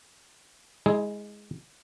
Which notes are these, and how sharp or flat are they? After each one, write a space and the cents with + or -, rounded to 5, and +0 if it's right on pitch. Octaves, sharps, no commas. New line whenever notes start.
G#3 +0 E4 -35 G#4 +0